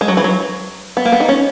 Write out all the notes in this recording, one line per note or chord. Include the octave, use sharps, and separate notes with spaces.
G#3
F#3
E3
F#3
B3
A#3
B3
D#4
C#4